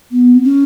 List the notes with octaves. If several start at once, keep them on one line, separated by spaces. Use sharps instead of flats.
B3
C4
C#4